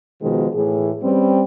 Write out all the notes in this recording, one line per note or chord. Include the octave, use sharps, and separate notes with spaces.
B2 D#3 F3 G#3
A2 E3 G#4
G3 C4 C#4 B4